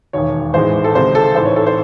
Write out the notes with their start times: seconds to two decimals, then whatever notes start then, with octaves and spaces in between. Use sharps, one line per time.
0.13 E1 D#2 D#3 C#5
0.54 A1 G#2 E3 G#3 C5
0.84 A4
0.95 C#2 C3 D#3 G#3 C5
1.15 A4
1.35 A1 G#2 E3 C5
1.45 C#5
1.56 A4
1.66 C5